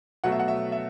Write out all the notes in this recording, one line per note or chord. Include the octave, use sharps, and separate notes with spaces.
B2 F#3 A3 F#5
E5
F#5
E5
E5